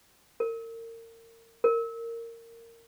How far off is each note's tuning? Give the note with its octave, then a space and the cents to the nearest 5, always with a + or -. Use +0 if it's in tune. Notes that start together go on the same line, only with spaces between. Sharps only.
A#4 -35
A#4 -20